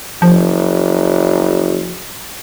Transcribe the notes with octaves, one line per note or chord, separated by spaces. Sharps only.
F#1 F3